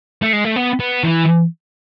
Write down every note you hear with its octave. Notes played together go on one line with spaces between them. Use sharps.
A3
G#3
A3
B3
B3
E3